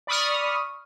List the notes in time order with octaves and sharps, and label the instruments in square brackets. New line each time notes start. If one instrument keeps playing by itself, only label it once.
[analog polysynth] D5 B5 C#6 D#6 F6